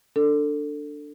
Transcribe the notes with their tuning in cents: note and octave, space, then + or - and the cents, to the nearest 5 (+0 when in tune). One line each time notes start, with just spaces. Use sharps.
D4 +0 A4 +20